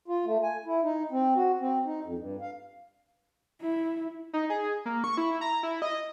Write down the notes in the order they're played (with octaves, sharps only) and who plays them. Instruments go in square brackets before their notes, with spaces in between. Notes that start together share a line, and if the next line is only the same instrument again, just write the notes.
[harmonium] F4
A3
G#5
E4
D#4
C4
F#4
C4
D#4
F2
G2
F5
[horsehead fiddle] E4
[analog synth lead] D#4
G#4
A#3
C#6
E4
A#5
E4
D#5